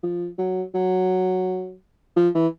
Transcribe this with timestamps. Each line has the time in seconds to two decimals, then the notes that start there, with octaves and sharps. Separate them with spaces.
0.03 F3
0.38 F#3
0.74 F#3
2.17 F3
2.35 E3